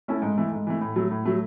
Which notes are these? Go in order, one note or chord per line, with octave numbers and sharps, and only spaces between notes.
A3 C#4 E4 A4
G#2
E3 A3
G#2
E3 A3
A2
F#3 A3
A2
F#3 A3